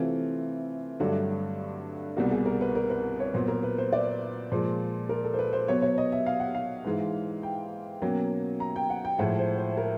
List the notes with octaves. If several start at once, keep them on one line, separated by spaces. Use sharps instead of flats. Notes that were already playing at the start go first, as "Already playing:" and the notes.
Already playing: C3 E3 A3 C4 F4
G2 D3 F#3 A3 D4 F#4
C2 B2 G3 A#3 F#4
G#4
A#4
B4
A#4
B4
C#5
A#2 F#3 B3 C5
A#4
B4
C5
D5
A#2 F3 G#3
A#4
A4
C5
B4
C5
B2 F#3 B3 C#5
C#5
D#5
E5
F5
F#5
F5
G#2 E3 G#3
G5
B2 F#3 A#3 C#4
A#5
G5
F#5
G5
A2 F3 G#3 F#5
C5
C5
A#4